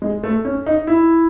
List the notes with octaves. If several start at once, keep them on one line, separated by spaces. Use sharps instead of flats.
G#3
A3
C#4
D#4
E4